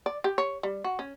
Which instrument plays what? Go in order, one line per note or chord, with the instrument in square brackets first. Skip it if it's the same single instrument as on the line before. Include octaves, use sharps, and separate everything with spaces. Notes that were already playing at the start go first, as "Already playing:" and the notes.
[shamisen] D5
G4
C#5
G3
F#4
C#4